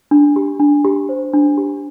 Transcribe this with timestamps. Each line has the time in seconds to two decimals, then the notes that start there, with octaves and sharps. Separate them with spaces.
0.11 D4
0.36 G4
0.60 D4
0.85 G4
1.09 C5
1.33 D4
1.58 G4